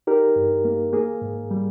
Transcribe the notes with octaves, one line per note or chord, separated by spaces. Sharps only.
D#4 G4 A#4
G2
A#3
A#3 G#4
G#2
G3